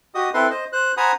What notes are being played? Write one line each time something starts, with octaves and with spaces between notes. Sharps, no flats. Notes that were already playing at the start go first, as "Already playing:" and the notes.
F#4 G4 D#5 D#6
C4 E4 A4 B4 C6
C5 D#5
C5 F#6
C5 F#5 G#5 A#5 B5 D#6